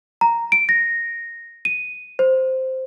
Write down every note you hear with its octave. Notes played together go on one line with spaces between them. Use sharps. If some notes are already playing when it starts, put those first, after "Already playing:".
A#5
D7
A#6
D#7
C5